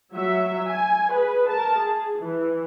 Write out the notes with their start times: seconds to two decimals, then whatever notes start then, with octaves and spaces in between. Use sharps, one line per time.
0.13 F#3 E5
0.67 G#5
1.13 G#4 B4
1.51 A#4 A5
1.79 G#4
2.19 E3